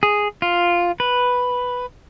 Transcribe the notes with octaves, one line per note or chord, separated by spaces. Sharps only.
G#4
F4
B4